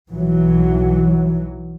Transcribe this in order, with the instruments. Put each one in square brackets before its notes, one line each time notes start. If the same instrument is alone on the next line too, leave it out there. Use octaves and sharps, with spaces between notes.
[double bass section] B1 E3 F#3